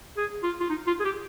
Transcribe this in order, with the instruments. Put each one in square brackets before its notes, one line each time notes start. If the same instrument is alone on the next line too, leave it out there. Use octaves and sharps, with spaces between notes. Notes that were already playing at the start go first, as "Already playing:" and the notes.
[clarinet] G#4
F4
F4
D#4
F4
G#4
G4